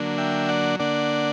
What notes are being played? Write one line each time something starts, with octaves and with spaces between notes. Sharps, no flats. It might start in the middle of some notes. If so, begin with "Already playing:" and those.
Already playing: D3 F#3 A#3 D4
E5 G5
D5 F#5
D3 A#3 D4 D5 F#5